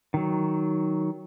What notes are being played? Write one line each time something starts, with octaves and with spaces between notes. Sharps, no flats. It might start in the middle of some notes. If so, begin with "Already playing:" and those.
D#3 F#3